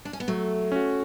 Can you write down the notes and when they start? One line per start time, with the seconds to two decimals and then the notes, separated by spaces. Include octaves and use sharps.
0.05 D4
0.13 C#4
0.20 B3
0.28 F#3 A3
0.72 C#4 F#4